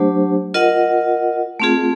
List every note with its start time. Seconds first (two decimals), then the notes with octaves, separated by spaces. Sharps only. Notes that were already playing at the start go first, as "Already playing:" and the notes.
Already playing: F#3 A3 D4 G4 C5
0.54 F4 A#4 D#5 F#5
1.60 A3 C4 F4 G#4